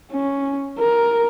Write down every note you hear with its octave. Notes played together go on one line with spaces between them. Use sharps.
C#4
A#4